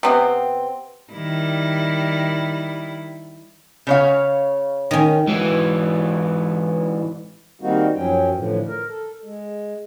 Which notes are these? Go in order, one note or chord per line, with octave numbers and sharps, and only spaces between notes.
C3 B3 C4
D#3 G3 E4
C#3 C#5 F5
D#3 C#4
G#2 E3
D#3 G3 A#3 C4 D#4 F#4
F#2 F3 F#3 C#4 G5
A2 D3 E3 F3
A#4
A4
G#3